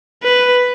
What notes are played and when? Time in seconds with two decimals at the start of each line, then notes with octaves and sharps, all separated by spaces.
0.24 B4